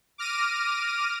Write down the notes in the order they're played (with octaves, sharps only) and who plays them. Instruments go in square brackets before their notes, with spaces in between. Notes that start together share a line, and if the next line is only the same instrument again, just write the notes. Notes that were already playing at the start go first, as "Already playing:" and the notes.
[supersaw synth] D6 F6 A#6 D#7